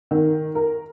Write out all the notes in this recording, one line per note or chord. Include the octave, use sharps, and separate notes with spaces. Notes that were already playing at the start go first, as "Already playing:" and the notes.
D#3
A#4